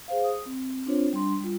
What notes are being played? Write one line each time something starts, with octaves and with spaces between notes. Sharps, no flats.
G#4 C5 F5
D#6
C4
C4 D4 F4 C5 C#5
G3 D4 C6
G3 F4